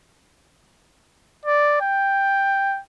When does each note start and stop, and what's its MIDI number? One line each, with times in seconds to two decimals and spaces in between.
1.46 1.79 74
1.81 2.80 79